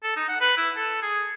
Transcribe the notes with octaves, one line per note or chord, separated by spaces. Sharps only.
A4
D#4
F#5
B4
E4
A4
G#4